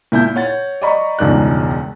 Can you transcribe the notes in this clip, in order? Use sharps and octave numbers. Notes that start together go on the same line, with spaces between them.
A#2 E4 A5 G6
C#5 F#5 A6
D5 D#5 A#5 B5 C#6
E1 C#2 G2 D#3 D5 F#6